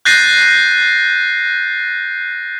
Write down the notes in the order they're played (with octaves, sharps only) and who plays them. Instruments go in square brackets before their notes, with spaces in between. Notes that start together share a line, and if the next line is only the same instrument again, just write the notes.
[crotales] F#6 G6 A6 A#6 C7 D#7